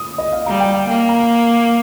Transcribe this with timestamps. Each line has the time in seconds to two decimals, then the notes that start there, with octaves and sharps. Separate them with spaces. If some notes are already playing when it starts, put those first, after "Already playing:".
Already playing: D#6
0.18 D#5
0.32 F5
0.46 G3 A#5
0.60 G5
0.74 F5
0.88 A#3 G5
1.09 A#5